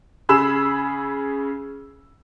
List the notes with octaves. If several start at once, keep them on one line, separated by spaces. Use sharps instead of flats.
C#3 G#4 B5 E6 E7